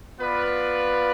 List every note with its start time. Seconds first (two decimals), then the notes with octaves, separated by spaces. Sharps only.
0.18 B3 F4 B4 D5 F5